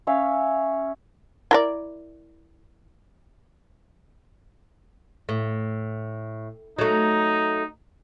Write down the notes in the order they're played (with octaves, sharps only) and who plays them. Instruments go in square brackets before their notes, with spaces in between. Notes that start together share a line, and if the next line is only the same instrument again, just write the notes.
[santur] C#4 C#5 E5 F5
[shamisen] E4 A#4 D5
[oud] A2
[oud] F#3 A3 [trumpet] D#4